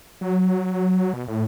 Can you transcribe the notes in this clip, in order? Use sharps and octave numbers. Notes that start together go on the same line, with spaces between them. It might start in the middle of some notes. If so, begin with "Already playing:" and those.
F#3
B2
A2